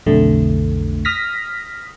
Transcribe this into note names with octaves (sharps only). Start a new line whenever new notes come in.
B1 F2 D3 A3
D#6 F6 A#6 B6